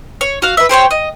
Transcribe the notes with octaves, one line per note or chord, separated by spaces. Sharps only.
C#5
F#4 F5
B4 E5
G4 C5 C#5 G5
D#5